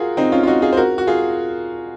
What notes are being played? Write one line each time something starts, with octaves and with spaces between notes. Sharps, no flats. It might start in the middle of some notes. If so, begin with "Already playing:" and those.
Already playing: F4 F#4 G#4 A#4
C4 D#4
C#4 F4
F4
D#4 F#4
F4 G#4
C5
F#4 A#4
F#4
F4 G#4